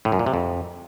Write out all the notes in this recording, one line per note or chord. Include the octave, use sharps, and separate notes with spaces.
A2
F#2
A#2
C3
F2